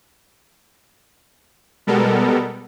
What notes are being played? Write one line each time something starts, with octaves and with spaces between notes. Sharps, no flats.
B2 G3 G#3 B3 A4 A#4